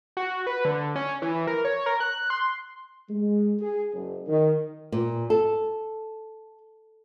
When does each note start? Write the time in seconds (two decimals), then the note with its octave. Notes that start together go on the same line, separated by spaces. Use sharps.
0.17 F#4
0.47 B4
0.65 D3
0.96 C#4
1.22 E3
1.47 A#4
1.65 C#5
1.86 A#4
2.00 F#6
2.30 C6
3.10 G#3
3.60 G#4
3.93 F#1
4.28 D#3
4.92 A#2
5.30 A4